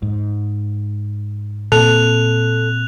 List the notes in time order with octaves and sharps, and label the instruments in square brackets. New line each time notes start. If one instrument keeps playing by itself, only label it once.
[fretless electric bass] G#2
[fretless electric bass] A#2 A#3 C4 [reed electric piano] A4 [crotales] F#6 F7